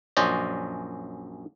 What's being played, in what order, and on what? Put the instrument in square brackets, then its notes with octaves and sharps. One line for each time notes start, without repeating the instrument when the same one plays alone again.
[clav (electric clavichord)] A#1 F#2 C#4 C5 D5 D#5